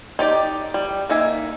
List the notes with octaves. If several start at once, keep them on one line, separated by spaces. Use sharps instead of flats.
D#4 G4 D5
G3
A#3 D#4 E5 G#5